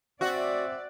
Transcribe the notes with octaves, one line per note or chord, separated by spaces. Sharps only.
C4 F#4 D5 E5